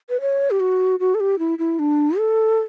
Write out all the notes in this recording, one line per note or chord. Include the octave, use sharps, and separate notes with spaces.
B4
C#5
G4
F#4
F#4
A4
G4
E4
E4
D4
A4